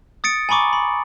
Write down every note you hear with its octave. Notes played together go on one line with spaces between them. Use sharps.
D#6 A6 C#7 D7
G#5 A#5 B5 C#6 D6
B5